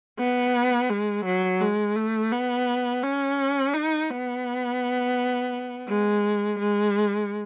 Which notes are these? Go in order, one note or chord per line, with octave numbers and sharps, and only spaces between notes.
B3
G#3
F#3
G#3
A3
B3
C#4
D#4
B3
G#3
G#3